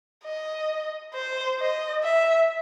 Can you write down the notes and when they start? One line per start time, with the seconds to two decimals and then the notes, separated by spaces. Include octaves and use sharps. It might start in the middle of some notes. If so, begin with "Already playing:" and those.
0.24 D#5
1.14 C5
1.59 D#5
2.03 E5